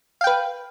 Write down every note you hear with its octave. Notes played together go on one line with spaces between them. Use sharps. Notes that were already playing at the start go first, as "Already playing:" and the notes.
B4 F5 G5